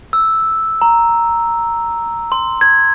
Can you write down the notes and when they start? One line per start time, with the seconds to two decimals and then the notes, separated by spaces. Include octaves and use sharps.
0.13 E6
0.82 A#5
2.32 C6
2.61 G#6